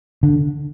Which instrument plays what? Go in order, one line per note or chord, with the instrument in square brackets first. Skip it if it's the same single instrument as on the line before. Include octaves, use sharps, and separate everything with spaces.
[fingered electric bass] D3